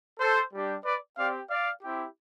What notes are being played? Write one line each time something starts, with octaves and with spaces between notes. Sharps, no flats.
A4 C5
G3 D4 G4
B4 D5
C4 G4 D5 F5
D5 F5
C4 E4 G4